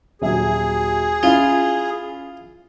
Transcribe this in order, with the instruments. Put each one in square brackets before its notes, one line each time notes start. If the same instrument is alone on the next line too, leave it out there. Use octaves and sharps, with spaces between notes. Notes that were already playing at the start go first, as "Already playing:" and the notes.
[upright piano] D#1 F#3 E5 [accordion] G#4
[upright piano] C#4 E4 [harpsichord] F4